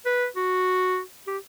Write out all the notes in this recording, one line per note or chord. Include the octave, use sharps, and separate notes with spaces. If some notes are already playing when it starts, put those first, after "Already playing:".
B4
F#4
G4